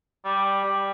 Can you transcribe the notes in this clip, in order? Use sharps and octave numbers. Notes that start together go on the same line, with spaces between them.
G3
G3